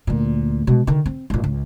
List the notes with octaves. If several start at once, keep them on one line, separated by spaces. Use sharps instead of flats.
D2 A#2
B2 G#3
D3 D#3
C4
G#1 A#2
C#2